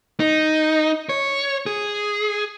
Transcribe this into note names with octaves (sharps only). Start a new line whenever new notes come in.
D#4
C#5
G#4